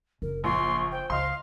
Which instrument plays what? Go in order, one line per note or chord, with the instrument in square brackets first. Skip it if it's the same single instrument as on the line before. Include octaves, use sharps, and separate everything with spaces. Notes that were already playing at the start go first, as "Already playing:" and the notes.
[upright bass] F#1 [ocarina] A#4
[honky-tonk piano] A#1 [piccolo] C6 [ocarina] C#6
[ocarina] C5 [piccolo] G5
[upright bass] C#2 [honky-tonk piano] D#5 C6 [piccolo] F5